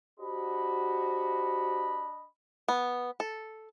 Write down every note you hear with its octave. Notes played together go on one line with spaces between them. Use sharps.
D4 F#4 G4 C5 D#5 B5
B3
A4